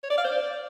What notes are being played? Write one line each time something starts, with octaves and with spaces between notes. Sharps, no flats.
C#5
D5
F5
C5
D5